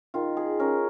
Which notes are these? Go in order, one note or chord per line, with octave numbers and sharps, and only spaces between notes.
D#3 F4
G#4
C#4 A#4